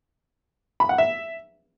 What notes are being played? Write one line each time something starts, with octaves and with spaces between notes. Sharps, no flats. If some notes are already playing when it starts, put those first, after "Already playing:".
B5
F#5
E5